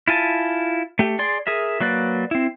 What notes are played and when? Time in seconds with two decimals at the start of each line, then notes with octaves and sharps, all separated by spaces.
0.08 E4 F4 G#5 A5
0.99 A3 G4
1.19 G#4 D5 C6
1.47 G#4 A#4 E5
1.81 F#3 A#3 B4 D5
2.31 C4 E4